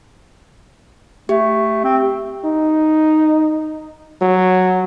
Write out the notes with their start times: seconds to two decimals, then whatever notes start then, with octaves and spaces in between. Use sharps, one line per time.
1.29 A3 G4
1.84 C4
2.45 D#4
4.22 F#3